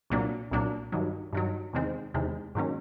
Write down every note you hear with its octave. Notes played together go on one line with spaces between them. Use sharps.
C2 A#2 F#3 A#3 D4
C2 A#2 F#3 A#3 D4
G2 D#3 F#3
G2 D#3 F#3
E2 C3 D#3 G#3 C4
E2 C3 D#3 G#3 C4
G#2 D#3 F#3 A#3 C#4